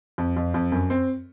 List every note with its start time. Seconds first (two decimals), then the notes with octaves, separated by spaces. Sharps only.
0.18 F2
0.37 F2
0.54 F2
0.72 F#2
0.90 C4